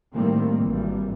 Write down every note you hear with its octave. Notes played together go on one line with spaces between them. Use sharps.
A2 D#3 G3 A#3 C4
G#1 E3 G3